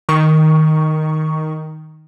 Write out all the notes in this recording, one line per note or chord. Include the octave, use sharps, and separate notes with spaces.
D#3 C#6